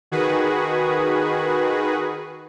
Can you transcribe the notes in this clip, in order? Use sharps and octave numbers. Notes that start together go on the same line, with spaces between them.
D#3 F#4 G#4 B4